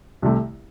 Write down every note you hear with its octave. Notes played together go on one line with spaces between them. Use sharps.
C2 C3 A3